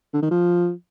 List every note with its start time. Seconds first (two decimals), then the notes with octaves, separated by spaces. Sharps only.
0.13 D3
0.22 D#3
0.31 F3